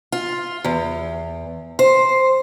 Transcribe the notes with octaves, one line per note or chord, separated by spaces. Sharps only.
F4
E2
C5